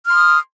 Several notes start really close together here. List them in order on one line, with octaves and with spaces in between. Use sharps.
F6 C6 D#6